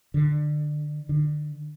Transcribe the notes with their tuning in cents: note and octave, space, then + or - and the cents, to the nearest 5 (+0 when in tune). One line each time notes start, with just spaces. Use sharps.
D3 +25
D3 +35